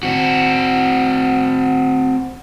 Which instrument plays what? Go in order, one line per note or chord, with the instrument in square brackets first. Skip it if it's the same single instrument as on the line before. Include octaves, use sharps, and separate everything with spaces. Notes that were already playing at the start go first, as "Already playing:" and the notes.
[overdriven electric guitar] C4 F#4